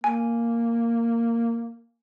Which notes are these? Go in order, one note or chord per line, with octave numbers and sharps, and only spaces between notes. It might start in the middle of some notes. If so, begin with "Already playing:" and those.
A#3 G#5